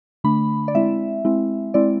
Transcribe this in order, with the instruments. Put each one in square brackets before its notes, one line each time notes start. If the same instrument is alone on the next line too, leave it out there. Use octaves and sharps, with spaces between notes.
[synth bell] D3 A3 D4 B5
D5
G#3 C4 E4 E5
G#3 C4 E4
G#3 C4 E4 D5